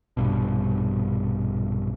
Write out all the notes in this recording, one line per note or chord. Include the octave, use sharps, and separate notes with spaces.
A#1 G2 B2